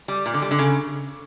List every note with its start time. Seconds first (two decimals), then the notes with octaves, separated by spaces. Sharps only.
0.08 G3
0.26 A#2
0.34 D3
0.42 G3
0.51 D3
0.59 C#3